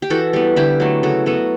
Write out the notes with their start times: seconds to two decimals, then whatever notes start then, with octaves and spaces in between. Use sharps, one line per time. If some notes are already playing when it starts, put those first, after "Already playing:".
0.02 G4
0.10 E3 F#4 A4
0.33 G3 B3
0.56 D3 E4 G4
0.80 F#3 A3
1.03 C#3 F#4 A4
1.26 F#3 B3 F#4 A4